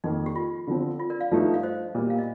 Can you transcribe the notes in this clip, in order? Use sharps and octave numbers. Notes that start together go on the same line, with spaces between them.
F2 D#3 A#3 D#4
G4
F4
D3 F3 C4
F4
A#4 D5
D5 F5
G2 F3 A3 D#4
F5
C5 D#5
A#2 G3 A#3
F5
D#5